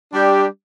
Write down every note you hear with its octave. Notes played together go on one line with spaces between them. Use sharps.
G3 D4 G4